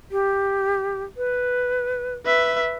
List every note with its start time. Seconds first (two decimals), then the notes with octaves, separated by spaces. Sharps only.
0.11 G4
1.17 B4
2.26 B4 E5